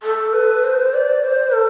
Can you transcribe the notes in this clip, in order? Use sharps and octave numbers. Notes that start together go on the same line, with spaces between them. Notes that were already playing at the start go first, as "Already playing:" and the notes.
A4
B4
C5
D5
C5
A4